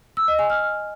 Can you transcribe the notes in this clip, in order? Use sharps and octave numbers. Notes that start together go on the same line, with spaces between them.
E6
D#5
G#5
F6